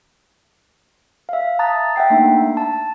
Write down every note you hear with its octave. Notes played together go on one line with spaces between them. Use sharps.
E5 F5
A5 A#5 D#6 F#6 A6
E5 F#5 G5 C7
A3 A#3 D4 D#4
A5